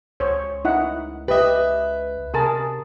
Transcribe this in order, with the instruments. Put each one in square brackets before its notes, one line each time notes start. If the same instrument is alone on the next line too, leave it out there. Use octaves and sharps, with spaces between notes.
[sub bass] C#2 [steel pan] C5 C#5
[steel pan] D#4 E4 F#5
[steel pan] G4 D#5 [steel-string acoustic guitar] B4 E5
[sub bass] C3 [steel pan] G#4 A#4 A5